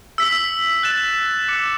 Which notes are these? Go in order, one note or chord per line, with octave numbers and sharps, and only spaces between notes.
E6 B6 F#7
F#6 A6 E7
D6 F#6 C#7